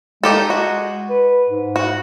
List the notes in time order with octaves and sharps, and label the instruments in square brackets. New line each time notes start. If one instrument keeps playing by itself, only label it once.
[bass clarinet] G#3 [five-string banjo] D#4 G4 A4
[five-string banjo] F#4
[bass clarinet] B4
G#2
[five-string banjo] F#4